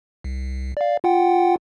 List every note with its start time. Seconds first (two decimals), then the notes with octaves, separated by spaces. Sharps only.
0.24 C2
0.77 D5 F5
1.04 F4 F#5 G5